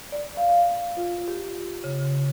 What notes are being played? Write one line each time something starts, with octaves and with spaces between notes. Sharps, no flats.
D5
F5
F4
G4
C#3